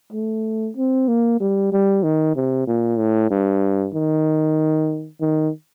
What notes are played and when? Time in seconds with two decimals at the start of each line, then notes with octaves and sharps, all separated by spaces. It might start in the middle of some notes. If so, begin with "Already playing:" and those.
0.12 A3
0.77 C4
1.08 A#3
1.40 G3
1.72 G3
2.03 D#3
2.35 C3
2.67 A#2
2.99 A2
3.31 G2
3.94 D#3
5.21 D#3